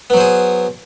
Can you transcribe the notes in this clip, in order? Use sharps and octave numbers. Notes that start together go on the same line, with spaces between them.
F#3 B3 G#4 C5